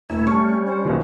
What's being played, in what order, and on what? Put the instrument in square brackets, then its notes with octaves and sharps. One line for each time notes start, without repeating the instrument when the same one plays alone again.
[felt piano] E1 [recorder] A3 [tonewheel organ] E4
[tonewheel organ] G3 C#4 [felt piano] A5 C#6
[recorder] C5
[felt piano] B1 B2 D#3